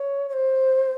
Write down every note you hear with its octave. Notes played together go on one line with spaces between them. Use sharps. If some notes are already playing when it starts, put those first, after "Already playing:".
Already playing: C#5
C#5
C5